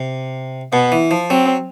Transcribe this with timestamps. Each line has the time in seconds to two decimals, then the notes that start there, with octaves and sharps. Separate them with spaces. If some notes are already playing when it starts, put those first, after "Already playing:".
Already playing: C3
0.73 B2 B3
0.92 E3
1.11 F3
1.30 F#3 C4